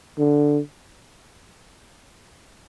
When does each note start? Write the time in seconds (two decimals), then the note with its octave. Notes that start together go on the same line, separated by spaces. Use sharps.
0.19 D3